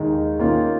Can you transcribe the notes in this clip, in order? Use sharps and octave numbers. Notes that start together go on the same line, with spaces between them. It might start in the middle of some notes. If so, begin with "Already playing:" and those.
Already playing: D#2 D#3 G#3 D#4
D#3 A#3 C#4 F4